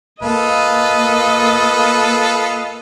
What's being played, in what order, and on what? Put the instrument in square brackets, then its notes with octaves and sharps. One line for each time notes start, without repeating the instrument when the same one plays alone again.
[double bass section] A#3 [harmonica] F4 A4 B4 [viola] D#5